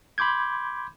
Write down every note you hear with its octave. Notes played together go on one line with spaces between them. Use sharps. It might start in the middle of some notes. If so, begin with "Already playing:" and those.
B5 C6 D6 G6 G#6